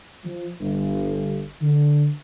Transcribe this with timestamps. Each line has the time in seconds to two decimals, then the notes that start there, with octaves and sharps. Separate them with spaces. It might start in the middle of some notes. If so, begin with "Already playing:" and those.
0.25 F3
0.59 G1
1.61 D3